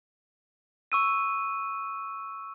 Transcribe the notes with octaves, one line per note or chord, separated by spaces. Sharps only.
C#6 E6 D#7